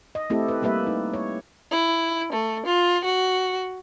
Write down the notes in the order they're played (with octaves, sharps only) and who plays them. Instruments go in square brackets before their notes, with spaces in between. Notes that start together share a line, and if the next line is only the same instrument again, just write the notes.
[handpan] D#5
A3 C4 E4 G4 A4
B4
G3 A#3 G4 B4 E5
D#4
C#5
[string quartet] E4
A3
F4
F#4